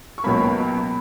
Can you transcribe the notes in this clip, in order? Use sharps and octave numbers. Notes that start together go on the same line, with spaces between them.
C#6
C#2 B2 F#3 A#3 B5